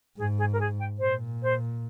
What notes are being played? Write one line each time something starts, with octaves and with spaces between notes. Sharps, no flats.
G#2 G#4
G#4
A#4
G#4
G5
A#2 C5
C5